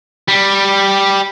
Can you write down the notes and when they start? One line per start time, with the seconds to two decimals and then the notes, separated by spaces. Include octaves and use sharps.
0.28 G3